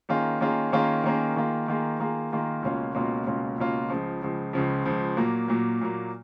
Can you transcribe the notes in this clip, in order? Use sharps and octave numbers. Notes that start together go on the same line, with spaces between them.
D#3 A#3 C#4 F4 G#4
D#3 A#3 C#4 F4 G#4
D#3 A#3 C#4 F4 G#4
D#3 A#3 C#4 F4 G#4
D#3 A#3 F4 G#4
D#3 A#3 F4 G#4
D#3 A#3 F4 G#4
D#3 A#3 F4 G#4
C#2 B2 A#3 C#4 F4
C#2 B2 A#3 C#4 F4
C#2 B2 A#3 C#4 F4
C#2 B2 A#3 C#4 F4
C#2 C#3 F3
C#2 C#3 F3
C#2 C#3 F3
C#2 C#3 F3
A#2 F#3 A#3
A#2 F#3 A#3
A#2 F#3 A#3